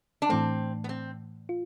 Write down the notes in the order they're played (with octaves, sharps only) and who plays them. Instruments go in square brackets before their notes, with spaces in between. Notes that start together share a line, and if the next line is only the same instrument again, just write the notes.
[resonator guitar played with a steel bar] D4
[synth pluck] A2 E3 A3 [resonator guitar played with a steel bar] C4
[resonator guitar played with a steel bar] B3
C4
[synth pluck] F4